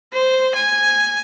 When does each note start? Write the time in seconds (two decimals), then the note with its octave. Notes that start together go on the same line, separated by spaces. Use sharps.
0.14 C5
0.55 G#5